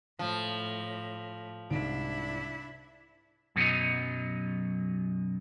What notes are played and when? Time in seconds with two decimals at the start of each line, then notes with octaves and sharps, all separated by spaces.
0.19 A2 F3
1.70 C2 G#2 D4 E4 D7
3.56 F#2 B2 D#3 F#3 D#4